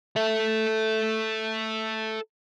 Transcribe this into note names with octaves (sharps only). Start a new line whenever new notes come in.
A4 E5